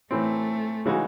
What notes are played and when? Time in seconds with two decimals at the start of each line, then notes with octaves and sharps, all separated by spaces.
0.11 A2 E3 A3 C4
0.86 C#3 E3 G#3 D#4 F#4